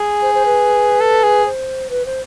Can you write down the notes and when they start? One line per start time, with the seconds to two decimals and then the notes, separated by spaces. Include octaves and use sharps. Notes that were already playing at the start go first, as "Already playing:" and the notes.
Already playing: G#4
0.22 C5
0.34 C5
0.45 B4
1.01 A4
1.23 G#4
1.45 C5
1.90 B4
2.05 C5